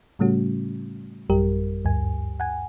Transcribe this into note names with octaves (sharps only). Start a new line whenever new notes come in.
A2 C#3 G3 A3 C#4 F#4
A1 F#2 G3 G4 A#4
D2 G2 G#5
F#5 G#5